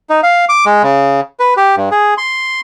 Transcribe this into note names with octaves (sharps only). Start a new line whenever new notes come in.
D#4
F5
D6
G#3
C#3
B4
G4
G2
G#4
C6